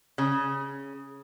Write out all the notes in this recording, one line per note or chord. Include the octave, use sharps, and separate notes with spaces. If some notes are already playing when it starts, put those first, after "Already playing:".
C#3